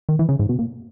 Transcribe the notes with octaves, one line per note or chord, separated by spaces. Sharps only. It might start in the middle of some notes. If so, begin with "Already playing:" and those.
D#3
E3
C#3
G#2
B2
A#2